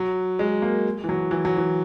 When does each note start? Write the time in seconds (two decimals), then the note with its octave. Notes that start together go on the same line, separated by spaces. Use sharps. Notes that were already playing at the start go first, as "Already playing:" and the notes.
Already playing: F#3
0.39 G#3
0.62 A#3
1.04 E3
1.09 F#3
1.31 E3
1.45 F#3
1.57 E3